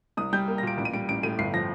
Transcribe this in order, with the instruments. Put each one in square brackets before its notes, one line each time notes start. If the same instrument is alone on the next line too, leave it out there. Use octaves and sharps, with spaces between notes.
[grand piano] C2 D#6
G3 G6
A#3
A#6
A#2 D7
A1 D7
D#7
G3 D7
A1 D7
A2 D#7
G1 C7
F3 A#6